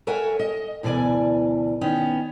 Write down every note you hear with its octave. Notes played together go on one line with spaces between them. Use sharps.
A4 A#4 C#5 E5 F#5 G#5
D#5
D2 B2 E3 D5 G#5
D#3 B3 C#4